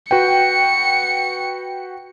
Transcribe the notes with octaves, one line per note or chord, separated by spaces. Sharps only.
F#4 B4 G5 C#7